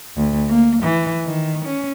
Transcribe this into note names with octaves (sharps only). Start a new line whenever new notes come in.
D2
A#3
E3
D#3
C#4